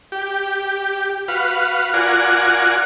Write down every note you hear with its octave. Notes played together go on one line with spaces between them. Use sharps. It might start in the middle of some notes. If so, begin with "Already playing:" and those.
G4
F#4 B4 F5
F4 F#4 A#4 D5 F#5 G#5